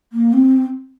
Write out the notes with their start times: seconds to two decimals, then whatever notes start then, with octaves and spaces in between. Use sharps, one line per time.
0.13 A#3
0.33 C4